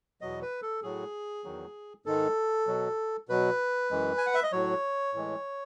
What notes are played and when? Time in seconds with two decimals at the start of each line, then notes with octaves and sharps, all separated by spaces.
0.21 E2 B2 F#3 D#5
0.42 B4
0.62 A4
0.83 A2 F#3 G#4
1.44 E2 D#3 F#3
2.06 G#2 D#3 G#3 A4
2.67 B2 F#3
3.29 B2 F#3 B4
3.91 F#2 E3 G#3
4.18 G#5
4.26 F#5
4.34 E5
4.43 D#5
4.52 A2 F#3 C#5
5.13 A2 E3 G#3